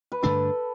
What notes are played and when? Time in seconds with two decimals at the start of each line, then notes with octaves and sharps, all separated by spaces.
0.12 B4
0.23 G2 D3 A3 D4 A4